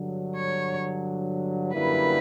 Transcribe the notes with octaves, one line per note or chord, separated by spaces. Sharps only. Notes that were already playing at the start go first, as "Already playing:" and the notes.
Already playing: G2 D3 F#3
C#5
F#2 D3 G3 A#3 E4 B4